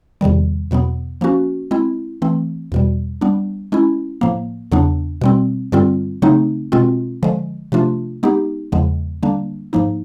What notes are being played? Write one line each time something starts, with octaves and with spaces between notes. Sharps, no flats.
E2 C3 D#3 G3
E2 B2 F#3 B3
F3 A#3 C#4 F#4
G#3 C4 E4
E3 A3 C4
E2 B2 G3
G3 B3 D4
G#3 C#4 E4
A2 F3 A#3
E2 C#3 F#3 B3 D4
B2 G3 C4
G2 D3 G3 C4 F4
C#3 F#3 A3 C4 D#4
B2 G#3 C4 F4
D3 F3 G#3
C3 F3 A3 D4 F4
G#3 B3 D#4 G4
E2 C#3 F3 G#3 B3
D3 G3 A#3 D4
G#2 F3 A#3 D#4